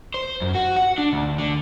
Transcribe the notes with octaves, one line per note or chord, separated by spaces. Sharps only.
C5
F#2
F#4
F#5
D4
D2
D3